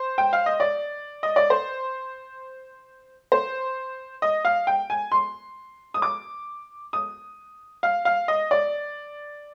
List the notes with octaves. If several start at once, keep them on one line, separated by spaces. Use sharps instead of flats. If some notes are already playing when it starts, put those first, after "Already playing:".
Already playing: C5
G5
F5
D#5
D5
D#5
D5
C5
C5
D#5
F5
G5
G#5
C6
D#6
D6
D#6
F5
F5
D#5
D5